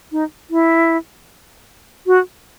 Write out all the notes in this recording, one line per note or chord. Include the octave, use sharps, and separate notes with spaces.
D#4
E4
F#4